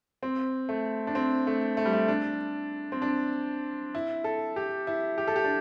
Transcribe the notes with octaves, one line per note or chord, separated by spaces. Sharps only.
C4
A3
D4
C4
A3
A3
G3
A3
D4
C4
D4
E4
A4
G4
E4
G4
A4
G4
D4